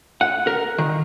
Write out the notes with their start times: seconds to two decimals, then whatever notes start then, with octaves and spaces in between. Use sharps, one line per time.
0.21 F#5
0.47 A#4
0.78 D#3